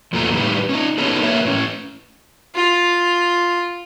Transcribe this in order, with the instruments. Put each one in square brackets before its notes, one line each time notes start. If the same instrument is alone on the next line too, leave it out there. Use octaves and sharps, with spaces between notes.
[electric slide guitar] E2 A#2 F3 A3 F#4 A#5
A2 D#3 G3 B4
C#4 D#4
B3 C#4 D#4 F#4 A4
A#3 A#4 B4 C#5 E5
A2 C#4
[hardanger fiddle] F4